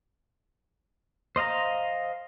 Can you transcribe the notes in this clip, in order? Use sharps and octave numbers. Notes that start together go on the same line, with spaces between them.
C5 D#5 F5 A#5